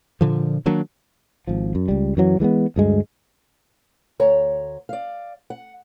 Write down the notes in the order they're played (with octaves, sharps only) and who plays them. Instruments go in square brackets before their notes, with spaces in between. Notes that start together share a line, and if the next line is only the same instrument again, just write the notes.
[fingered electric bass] A#2 D3 F3
D#3 F#3 A#3 D4
[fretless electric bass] G#1 F3
F#2
C#2 G3
F#2 E3 F#3
E3 G#3 A3 B3
D2 G2 G#3
[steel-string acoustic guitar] D2 C#5 A#5
D5 F5
F#5